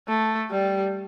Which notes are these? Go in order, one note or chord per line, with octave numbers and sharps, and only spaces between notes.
A3
G3